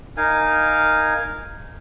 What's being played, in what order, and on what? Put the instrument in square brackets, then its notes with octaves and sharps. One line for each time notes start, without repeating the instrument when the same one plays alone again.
[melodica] D#4 A#4 F5 G#5